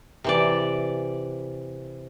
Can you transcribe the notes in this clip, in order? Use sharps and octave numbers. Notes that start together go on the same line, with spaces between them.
C3 E3 D5